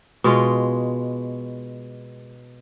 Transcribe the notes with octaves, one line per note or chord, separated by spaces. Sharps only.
B2 G#3 F4